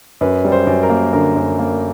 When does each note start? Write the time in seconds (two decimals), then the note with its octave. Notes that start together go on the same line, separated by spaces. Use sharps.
0.21 F#2 B4
0.45 G3
0.52 C5
0.67 F#2
0.83 A#4
0.90 A#3
1.13 D3 A#4
1.36 F#2
1.59 A#3